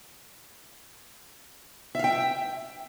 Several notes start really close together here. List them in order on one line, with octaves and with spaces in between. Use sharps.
E5 F5 G5